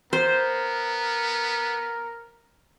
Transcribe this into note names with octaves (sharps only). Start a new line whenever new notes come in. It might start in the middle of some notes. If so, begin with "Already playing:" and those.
B3 A#4 C5